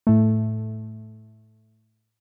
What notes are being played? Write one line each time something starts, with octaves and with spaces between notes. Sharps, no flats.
A2 A3